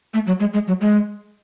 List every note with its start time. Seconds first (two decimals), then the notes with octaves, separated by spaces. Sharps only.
0.14 A3
0.27 F#3
0.40 G#3
0.53 G#3
0.67 F#3
0.81 G#3